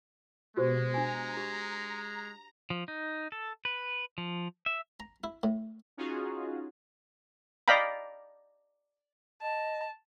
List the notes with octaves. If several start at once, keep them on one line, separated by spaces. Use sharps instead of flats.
B2 G#3 F#4 G4 C5
D4 G#5 A#5
G4
F3
D#4
A4
B4
F3
E5
A#5
E4
A2
C#4 D#4 F4 F#4 G#4
D5 D#5 F5 G5 A#5 B5
D#5 A5